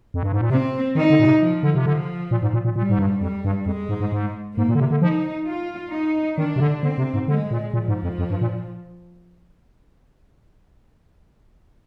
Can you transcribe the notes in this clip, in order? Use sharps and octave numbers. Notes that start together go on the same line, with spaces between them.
F2
G2
G#2
A#2
C3 C4
D#3 D#4
D3
A#2
C3
F3
D3
C3
D3 F3
A#2
G#2
A#2
A#2
A#2 G3
G#2
G2
F2 G3
G2
F2 G#3
G#2
G#2
G#2
G#2 A#3
A#2
D3
C3
D3
F3 D#4
F4
D#4
D#3 D4
C3
D3
D3 C4
C3
G#2
D3 G#3
A#2
A#2 F3
G#2
F2
F2
G2
A#2